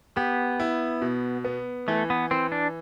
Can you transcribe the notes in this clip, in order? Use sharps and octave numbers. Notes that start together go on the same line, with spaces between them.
B3 G4
E4
B2
B3
E3 A3
B3
E3 C4
D4